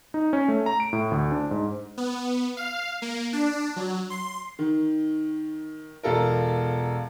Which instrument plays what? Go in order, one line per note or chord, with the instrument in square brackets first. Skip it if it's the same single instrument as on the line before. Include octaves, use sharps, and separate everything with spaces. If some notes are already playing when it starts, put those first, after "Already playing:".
[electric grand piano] D#4
C#4
A3
A#5
D7
A2
D2
D4
G#2
[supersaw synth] B3
F5
A#3
D4
F#3
C6
[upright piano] D#3
E1 F4 A4 A#4